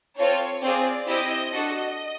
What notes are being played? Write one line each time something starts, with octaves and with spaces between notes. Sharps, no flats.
C4 F4 A4 C#5
C4 F4 G#4 D5
C4 E4 G4 D#5
D4 F#4 A4 D#5